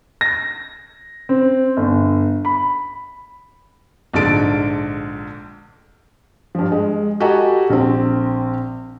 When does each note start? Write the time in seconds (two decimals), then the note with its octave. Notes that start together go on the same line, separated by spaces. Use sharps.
0.21 A#6
1.29 C4
1.77 G1
2.45 B5
4.13 A#1 G#2 D3 A4 A6 D7
6.55 G2 F3
6.72 G#3
7.20 F#4 G4 A4 D#5 G#5 A#5
7.70 A#1 C4